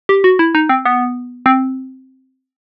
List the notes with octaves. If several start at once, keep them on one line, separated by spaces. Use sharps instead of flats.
G4
F#4
E4
D#4
C4
B3
C4